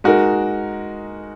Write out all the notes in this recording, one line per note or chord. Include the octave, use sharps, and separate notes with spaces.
G#3 D#4 F#4 A#4